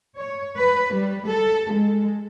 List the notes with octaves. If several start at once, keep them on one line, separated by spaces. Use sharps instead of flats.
C#5
B4
G3
A4
G#3